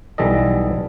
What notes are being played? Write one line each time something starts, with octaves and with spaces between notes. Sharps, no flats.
B1 E3 G3 A4 D#5